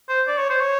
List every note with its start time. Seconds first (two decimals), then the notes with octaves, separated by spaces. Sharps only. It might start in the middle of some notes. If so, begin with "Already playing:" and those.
0.09 C5
0.28 D5
0.38 C#5
0.50 C5
0.61 C#5